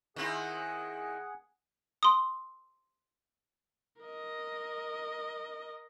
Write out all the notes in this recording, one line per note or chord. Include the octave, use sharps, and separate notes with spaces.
D#3 C4 E4 G#4 F#5
C6 D#6
A#4 D#5